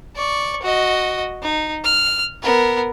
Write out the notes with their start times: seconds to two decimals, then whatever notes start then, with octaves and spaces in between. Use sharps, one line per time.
0.16 D5 C#6
0.63 F#4 D#5
1.42 D#4
1.84 F6
2.43 B3 A#4